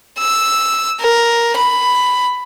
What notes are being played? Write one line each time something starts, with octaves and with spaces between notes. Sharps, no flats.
E6
A#4
B5